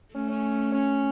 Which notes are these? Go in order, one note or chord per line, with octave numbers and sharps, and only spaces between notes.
A3 C#4
C#4
C#4